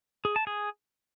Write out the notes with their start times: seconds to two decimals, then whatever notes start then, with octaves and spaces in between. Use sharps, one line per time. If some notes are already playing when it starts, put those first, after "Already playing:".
0.25 G#4
0.36 A5
0.47 G#4